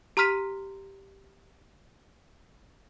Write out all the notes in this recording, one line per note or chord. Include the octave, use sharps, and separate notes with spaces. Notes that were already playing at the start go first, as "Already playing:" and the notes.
G4 A#5 C6 F6 B6 D#7